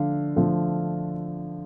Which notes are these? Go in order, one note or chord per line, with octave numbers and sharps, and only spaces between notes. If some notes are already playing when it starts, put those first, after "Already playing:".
Already playing: D3 F3 A3 F5
D3 F3 A3